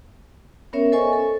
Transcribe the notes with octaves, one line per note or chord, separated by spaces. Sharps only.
B3 C#4 A#4 C#5 E5
A4 C5 D#5 G#5 C#6
A4